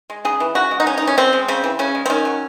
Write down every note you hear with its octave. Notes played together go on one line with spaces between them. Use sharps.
G#3
C#3 G#4
E3
C#3 F#4
G#3
D#4
C#3 C#4
D#4
E3
C#4
C#3 C4
G#3
C#3 C4
E3
C#3 C#4
G#3
C4
D#3 C#4
F#3